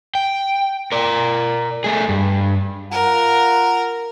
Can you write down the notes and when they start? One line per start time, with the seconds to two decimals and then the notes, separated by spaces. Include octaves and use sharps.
0.15 G5
0.92 A#4 D5
1.84 A3 G#4
2.09 G2
2.91 F4 A#4 F#5